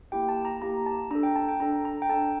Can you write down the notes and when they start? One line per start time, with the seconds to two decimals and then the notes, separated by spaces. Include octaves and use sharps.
0.12 A#3 E4 G4 G5
0.29 A5
0.45 A#5
0.62 A#3 E4 G4 A#5
0.86 A5
1.11 D4 A#5
1.15 A4
1.23 G5
1.36 A5
1.48 G5
1.60 D4 A4 A#5
1.85 A#5
2.02 G5
2.09 D4 A4 A5